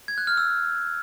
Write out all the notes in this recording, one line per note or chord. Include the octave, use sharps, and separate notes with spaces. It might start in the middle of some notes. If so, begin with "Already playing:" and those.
G#6
F#6
F6
E6